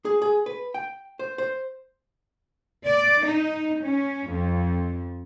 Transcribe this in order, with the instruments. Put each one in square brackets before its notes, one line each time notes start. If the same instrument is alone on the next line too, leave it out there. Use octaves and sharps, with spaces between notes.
[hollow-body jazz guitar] G#4
G#4
B4
G5
C5
C5
[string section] D5
D#4
C#4
F2